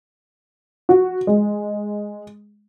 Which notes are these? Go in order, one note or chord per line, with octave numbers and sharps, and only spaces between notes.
F#4
G#3